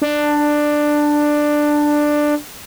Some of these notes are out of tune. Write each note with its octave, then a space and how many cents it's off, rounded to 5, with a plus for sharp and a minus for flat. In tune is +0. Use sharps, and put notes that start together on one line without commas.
D4 +10